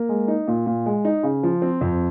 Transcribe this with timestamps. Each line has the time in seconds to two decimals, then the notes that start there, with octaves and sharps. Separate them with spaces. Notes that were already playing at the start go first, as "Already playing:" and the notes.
Already playing: A#3
0.09 G#3
0.28 D#4
0.47 A#2
0.66 A#2
0.86 G#3
1.05 D#4
1.23 C#3
1.43 F3
1.62 C4
1.81 F2